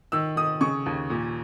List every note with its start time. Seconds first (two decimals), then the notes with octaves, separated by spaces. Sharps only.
0.12 D#3 E6
0.36 D#3 D#6
0.61 C#3 C#6
0.86 D#2
1.10 A#2